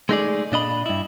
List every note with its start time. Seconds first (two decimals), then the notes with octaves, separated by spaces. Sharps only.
0.09 G#3 A3 D#4 F#4 G#4 D5
0.52 A#2 D4 D#5 B5
0.86 G2 E4